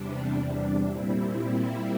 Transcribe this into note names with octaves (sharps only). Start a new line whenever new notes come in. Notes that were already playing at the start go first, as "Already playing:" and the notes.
Already playing: E2 C3 G3 D4
A#2 G3 C4 E4